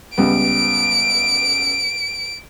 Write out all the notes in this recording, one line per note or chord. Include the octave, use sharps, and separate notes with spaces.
C#2 G3 B3 D7